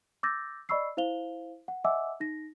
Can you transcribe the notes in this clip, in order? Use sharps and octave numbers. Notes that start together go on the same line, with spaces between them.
D6 E6 G6 A6 A#6
D5 D#5 B5 C#6 E6 C7
E4 C5 F5 F7 G7
F#5
D#5 E5 F#5 G#5 D6 E6
D#4 A#6